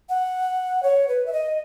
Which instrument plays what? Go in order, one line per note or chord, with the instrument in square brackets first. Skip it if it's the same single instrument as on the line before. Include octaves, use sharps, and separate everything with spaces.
[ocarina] F#5
C#5
B4
E5
D#5